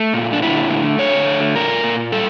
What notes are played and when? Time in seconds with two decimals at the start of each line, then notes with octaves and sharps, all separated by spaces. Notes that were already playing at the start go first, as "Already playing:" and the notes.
Already playing: A3
0.14 A#2
0.33 D4
0.42 D3 E4
0.70 A3
0.99 D3 C#5
1.27 A3
1.55 A#2 A#4
1.84 A#2
2.12 G3 A4